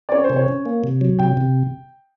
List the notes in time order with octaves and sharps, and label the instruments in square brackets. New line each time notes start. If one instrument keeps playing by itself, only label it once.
[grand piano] D5
[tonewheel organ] C#4 [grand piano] C#5
[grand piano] C5
[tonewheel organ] C3
[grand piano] C#5
[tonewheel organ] C#4
A#3
C3
F#3
[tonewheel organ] C3 [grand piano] G5
[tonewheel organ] C3